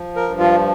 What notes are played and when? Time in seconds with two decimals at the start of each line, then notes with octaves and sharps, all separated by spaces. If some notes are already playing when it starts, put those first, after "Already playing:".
Already playing: F3
0.16 A#4
0.28 G2
0.40 F4